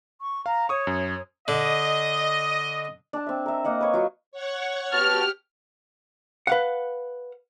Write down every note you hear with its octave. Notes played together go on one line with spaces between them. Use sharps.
C#6
F5 A#5
C#5 C#6 D#6
F#2
D3 D#5
D4 A5
C4 E5
A#4 E5
A#3 D#5 F#5
B4 C#5
F#3 F4
C#5 F#5 C#6
B3 F#4 G4 A5 F6
B4 F5 F#5